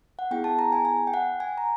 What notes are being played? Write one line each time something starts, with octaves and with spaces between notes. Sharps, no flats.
F#5
B3 E4 G#4 G5
A5
A#5
G#5
G#5
G5
F#5
G#5
A#5